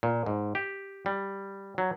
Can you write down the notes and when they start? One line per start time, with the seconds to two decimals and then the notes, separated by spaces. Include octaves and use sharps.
0.03 A#2
0.26 G#2
0.55 G4
1.06 G3
1.78 F#3